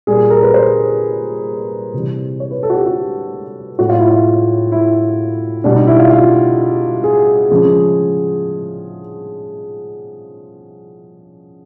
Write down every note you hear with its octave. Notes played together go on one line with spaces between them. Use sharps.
A#2 G3 G#4
A#4
B4
C5
C3 E3 G3
C#5
B4
A4
F#4
G4
F#4
A2 F#3 F#4
F4
E4
F4
E4
B2 G3 D4
D#4
E4
F4
F4
G#4
C#3 F3 G#3